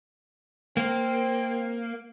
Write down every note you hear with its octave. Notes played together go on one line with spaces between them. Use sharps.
A#3 C4